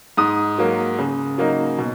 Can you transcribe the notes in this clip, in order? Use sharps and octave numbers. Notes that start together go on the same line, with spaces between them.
G#2 D#6
F#3 A#3
C#3
F#3 A#3 D#4
B2